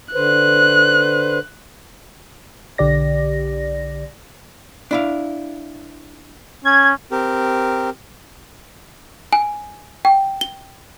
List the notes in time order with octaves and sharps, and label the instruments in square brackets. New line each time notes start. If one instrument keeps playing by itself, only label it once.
[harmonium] D3 B4 C5 [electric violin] F#6
[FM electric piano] B1 D3 G4 D5 A#6
[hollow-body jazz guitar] D4 E4 F5
[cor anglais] C#4 [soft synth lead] G#6
[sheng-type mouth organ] C4 G4 A#4
[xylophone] G#5
G5
G7